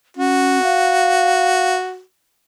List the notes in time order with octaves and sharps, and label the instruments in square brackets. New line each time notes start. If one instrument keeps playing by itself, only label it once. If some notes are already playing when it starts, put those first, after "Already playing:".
[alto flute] C#4 [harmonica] F#4
[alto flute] F5